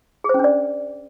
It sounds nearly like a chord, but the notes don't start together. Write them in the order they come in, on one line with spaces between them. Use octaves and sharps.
G#4 C5 C#4 D4 D5